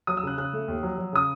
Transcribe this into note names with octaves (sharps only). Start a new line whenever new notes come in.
F#3 D#6
E6
C#3 F#6
C#3 F#6
A3
D#2
F#3
F#3
C#3 D#6